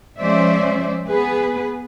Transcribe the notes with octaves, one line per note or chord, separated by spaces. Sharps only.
F3 G#3 C#4 C5 D5 E5
B3 G#4 B4